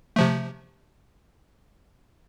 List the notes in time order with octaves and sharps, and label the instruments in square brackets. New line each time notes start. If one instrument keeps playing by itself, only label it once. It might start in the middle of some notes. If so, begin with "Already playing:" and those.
[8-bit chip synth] C3 F3 A3